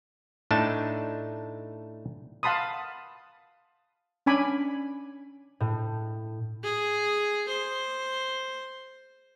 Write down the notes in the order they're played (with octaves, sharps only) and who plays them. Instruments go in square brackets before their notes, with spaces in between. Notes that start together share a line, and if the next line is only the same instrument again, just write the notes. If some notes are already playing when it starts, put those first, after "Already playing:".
[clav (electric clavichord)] A2 A3 D4 D#4 A5
[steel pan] F5 F#5 A5 B5 C6 D#6
C#4 D4 G#5 B5 D6
[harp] A2
[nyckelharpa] G#4
C5